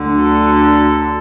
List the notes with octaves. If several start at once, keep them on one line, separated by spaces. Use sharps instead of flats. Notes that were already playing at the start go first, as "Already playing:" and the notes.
Already playing: D2 D3 F#3
A4